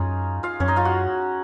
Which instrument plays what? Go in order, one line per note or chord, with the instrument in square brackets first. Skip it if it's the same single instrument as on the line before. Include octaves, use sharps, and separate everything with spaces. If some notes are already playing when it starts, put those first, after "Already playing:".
Already playing: [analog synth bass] F#2 [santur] C#4 D#4 F4 G#4 C#5
[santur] F4 F5
[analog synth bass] F#2 [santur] C#4 C#5
[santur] D#4 D#5
F4 F5
F#4 F#5